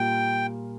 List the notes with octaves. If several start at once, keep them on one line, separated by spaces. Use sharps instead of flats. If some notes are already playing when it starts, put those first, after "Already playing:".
Already playing: A#2 G3 A#3 F4 G5